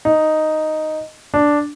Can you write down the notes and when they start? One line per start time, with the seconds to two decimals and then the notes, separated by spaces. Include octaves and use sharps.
0.05 D#4
1.34 D4